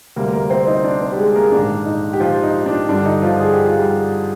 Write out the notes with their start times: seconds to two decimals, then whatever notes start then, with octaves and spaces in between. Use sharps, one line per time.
0.16 D2 C3 G3 A#3 A#4
0.33 A#3 A#4
0.50 C4 C5
0.67 D#4 D#5
0.84 D4 D5
1.01 C4 C5
1.12 G4
1.19 G#3 G#4
1.31 G#4
1.35 A#3 A#4
1.52 A#1 G#2 D#3 A#3 D4
1.86 D#4
2.13 G4
2.20 F3 F4
2.43 D#4
2.66 D4
2.89 G2 D3 G3 D4
3.06 D#4
3.22 F3 F4
3.40 G#4
3.53 G4
3.65 F4
3.79 G3 G4